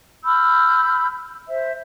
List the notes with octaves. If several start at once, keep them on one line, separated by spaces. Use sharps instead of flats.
B5 E6 F6 G6
C5 E5